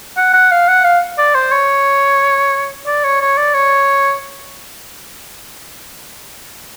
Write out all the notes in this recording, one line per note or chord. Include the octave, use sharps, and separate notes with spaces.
F#5
F#5
F5
F#5
F5
D5
C5
C#5
D5
C#5
C#5
D5
C#5